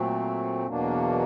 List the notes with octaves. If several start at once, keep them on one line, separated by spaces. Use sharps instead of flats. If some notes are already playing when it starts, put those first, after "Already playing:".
Already playing: A#2 F#3 A3 C4
E2 B2 F#3 A#3 D4